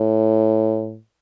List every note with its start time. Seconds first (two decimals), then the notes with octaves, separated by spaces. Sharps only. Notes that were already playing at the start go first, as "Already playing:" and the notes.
Already playing: A2